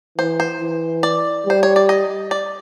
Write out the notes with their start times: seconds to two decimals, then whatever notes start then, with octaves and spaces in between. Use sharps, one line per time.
0.18 E3 C5
0.40 C5
0.61 E3
1.03 D5
1.46 G3 C5
1.63 C#5
1.76 D5
1.89 D#5
2.31 D5